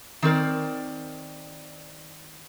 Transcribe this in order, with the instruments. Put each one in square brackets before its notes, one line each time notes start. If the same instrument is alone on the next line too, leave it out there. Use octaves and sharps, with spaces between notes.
[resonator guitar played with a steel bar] D#3 C4 A#4 D5